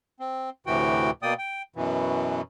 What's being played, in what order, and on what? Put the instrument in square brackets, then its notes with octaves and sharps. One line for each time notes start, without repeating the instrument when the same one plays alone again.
[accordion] C4
D2 A2 C3 E3 F#4 G5
B2 A#3 D5 G5 D#6
G5
F#2 B2 E3